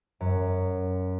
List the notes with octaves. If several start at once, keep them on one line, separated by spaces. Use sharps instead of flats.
F#2